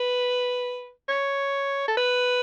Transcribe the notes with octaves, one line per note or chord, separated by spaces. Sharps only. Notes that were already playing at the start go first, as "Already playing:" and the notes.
Already playing: B4
C#5
A4
B4